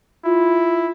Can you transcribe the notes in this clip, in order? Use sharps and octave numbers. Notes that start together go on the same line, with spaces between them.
E4 F4